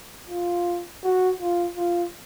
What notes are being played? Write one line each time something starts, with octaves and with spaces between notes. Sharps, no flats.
F4
F#4
F4
F4